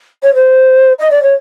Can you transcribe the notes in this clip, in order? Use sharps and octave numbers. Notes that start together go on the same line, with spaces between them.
C#5
C5
D#5
D5
C#5